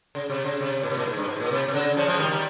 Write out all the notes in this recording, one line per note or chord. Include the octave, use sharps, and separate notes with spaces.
C#3
C3
C#3
C3
A#2
C3
A#2
G#2
G2
G#2
A#2
C3
C3
C#3
C#3 F3
F3 G#3
D#3 G3
D#3 G3